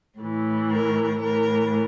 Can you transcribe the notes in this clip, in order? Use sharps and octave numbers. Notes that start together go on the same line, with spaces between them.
A2 E3
A#4
A2 E3 A#4